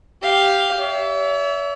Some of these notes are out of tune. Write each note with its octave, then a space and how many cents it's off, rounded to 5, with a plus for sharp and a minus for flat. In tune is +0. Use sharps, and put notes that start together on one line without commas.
G4 +0 F5 +0
C#5 +45 E5 +0